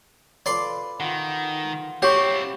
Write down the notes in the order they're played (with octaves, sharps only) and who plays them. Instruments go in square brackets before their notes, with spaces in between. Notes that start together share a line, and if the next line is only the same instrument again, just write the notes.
[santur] F4 A4 B4 [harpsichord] D5 C6 D6
[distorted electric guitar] D#3 [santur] F4 F#5
[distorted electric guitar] C4 E4 [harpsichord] G4 [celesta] C#5 C#6